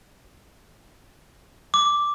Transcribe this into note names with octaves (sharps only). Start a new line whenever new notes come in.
D6